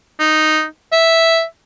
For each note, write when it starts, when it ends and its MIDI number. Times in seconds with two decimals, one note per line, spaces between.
0.20 0.64 63
0.92 1.43 76